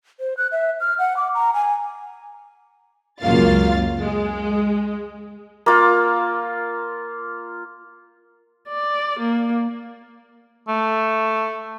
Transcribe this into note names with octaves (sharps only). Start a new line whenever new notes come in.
C5
F#6
E5
F6
F#5
D6
A#5
G#5
C#2 F#2 A#3 F4 F5 A6
G#3
A#3 F4
D5
A#3
A3